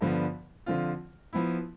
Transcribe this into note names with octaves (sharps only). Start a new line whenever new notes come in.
G2 D3 F3 B3
D3 F3 C4 F4
F3 B3 E4